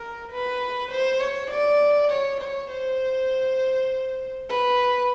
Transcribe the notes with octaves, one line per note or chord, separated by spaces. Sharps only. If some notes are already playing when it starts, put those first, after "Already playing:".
Already playing: A#4
B4
C5
C#5
D5
C#5
C#5
C5
B4